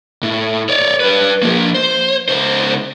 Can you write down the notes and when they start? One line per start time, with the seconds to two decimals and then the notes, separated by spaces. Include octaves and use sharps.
0.23 A2
0.69 C#5 D5
1.00 G3 B4
1.43 F3 A#3
1.74 C5
2.29 C#2 C5